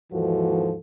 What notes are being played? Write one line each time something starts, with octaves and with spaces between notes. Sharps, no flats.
D#2 G#2 E3 F3 F#4 A4